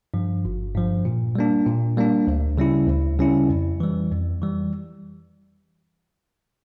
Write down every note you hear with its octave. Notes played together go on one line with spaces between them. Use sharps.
G2 F3
G1
G2 F3
A#2
G3 A#3 D4
A#2
G3 A#3 D4
D2
C#3 G3 C#4 E4
D2
C#3 G3 C#4 E4
F2
E3 G3
F2
E3 G3